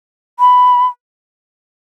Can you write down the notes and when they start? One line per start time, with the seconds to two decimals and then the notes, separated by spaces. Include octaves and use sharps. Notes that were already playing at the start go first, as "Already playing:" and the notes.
0.39 B5